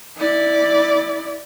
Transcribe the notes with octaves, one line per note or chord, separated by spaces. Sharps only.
E4 D5